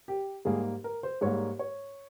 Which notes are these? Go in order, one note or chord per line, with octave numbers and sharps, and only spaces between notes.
G4
G#2 G3 A#3 G#4
A#4
C5
G#2 G3 A#3 C#5
C#5